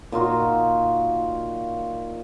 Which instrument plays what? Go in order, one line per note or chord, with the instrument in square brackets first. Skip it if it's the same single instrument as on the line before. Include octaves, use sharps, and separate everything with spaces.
[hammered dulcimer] A#2 D#4 F4 F#4